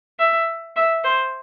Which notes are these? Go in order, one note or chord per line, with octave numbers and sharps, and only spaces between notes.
E5
E5
C5